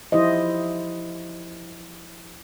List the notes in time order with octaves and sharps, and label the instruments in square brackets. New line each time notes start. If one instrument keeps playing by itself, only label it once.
[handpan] F3 E4 G4 C5 D#5